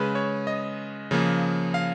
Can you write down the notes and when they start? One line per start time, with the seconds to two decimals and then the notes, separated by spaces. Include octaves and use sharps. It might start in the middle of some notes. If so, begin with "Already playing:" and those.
Already playing: C#3 G#3 B4
0.15 C#5
0.47 D#5
1.11 C#3 F3 A#3
1.74 F5